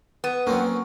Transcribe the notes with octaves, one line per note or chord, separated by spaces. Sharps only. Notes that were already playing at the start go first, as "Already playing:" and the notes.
B3
F#3 A#3 C4 C#4